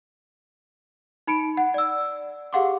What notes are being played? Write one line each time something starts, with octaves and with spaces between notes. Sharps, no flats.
D#4 B5 C#7 D7
F#5
D5 E6
G4 G#4 F5 F#5 C6 D6